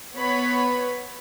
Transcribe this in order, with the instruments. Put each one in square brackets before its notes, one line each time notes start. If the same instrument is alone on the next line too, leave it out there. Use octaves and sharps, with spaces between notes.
[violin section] B3 B4 C#5 B5